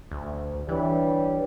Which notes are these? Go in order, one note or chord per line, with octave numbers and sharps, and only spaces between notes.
D2
E3 G3 D4 B4 C#5